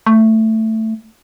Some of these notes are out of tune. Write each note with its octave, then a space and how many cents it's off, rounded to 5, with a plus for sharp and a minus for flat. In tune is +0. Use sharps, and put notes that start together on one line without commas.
A3 +10